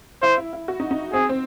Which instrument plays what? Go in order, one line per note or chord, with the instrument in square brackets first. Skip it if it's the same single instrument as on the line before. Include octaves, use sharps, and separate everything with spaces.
[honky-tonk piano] E4 [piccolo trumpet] C5
[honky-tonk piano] E4
E4
F#4
D#4
D#4
[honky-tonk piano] C4 [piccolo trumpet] G#4
[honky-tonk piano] C4